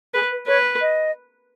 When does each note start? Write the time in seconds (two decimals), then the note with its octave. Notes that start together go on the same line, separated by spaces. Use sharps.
0.14 G#4 B4
0.31 B4
0.47 B4 C#5
0.81 D#5